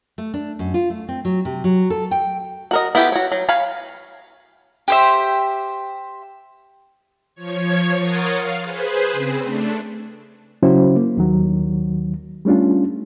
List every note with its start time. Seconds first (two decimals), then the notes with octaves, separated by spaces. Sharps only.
0.18 A3
0.34 D4
0.59 F#2
0.74 F4
0.90 A3
1.08 C4
1.25 F#3
1.45 C3
1.64 F#3
1.90 A4
2.11 G5
2.71 F#4 A#4 D#5
2.95 B3 E4 F4 G4 A4
3.12 F#4 C#5
3.32 F#3
3.49 C#5 F5 G#5 B5
4.88 G4 C5 E5
7.35 F3 C#5 G#6
7.99 A#4 C#5 F#5 C6 D#6 A6
8.33 F5
8.64 G#4 B4 C5
9.12 C#3 C4
9.41 A3 D4
10.62 C#3 F#3 C#4 E4 F#4 C5
10.96 A#3
11.17 D#2 D#3 F#3
12.45 G3 A3 C#4 D4 F4